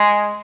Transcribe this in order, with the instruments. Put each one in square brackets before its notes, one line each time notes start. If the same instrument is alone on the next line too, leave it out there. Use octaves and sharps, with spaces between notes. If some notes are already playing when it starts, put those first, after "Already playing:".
Already playing: [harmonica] G#3